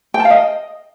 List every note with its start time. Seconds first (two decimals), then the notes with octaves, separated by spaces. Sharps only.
0.14 G5
0.20 A5
0.25 F5
0.30 D#5